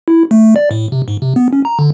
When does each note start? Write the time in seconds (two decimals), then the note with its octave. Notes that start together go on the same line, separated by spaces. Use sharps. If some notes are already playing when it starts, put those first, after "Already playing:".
0.08 E4
0.31 A3
0.56 D5
0.71 A2
0.92 C3
1.08 G#2
1.22 C3
1.36 B3
1.53 C#4
1.65 A#5
1.79 D3